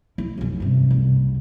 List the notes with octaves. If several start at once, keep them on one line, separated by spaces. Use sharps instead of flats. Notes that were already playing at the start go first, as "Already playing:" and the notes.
E4
B1 F#2
G2 C3
F#1 C2